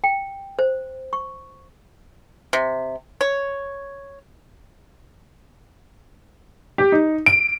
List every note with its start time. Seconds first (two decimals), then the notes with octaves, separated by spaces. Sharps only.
0.04 G5
0.59 C5
1.13 C#6
2.53 C3
3.21 C#5
6.78 G4
6.92 D#4
7.26 D7